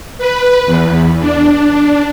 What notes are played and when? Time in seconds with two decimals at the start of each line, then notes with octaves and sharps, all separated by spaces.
0.18 B4
0.66 E2
1.20 D4